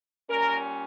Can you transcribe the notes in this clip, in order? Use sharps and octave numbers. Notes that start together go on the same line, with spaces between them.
A#2 G3 C#4 A#4